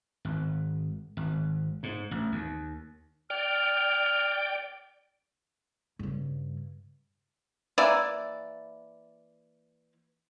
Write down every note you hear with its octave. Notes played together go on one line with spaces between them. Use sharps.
G#1
G#1
G#2
A1
D#2
D5 G5 F6
G2 C#3
E3 A#3 E4 D5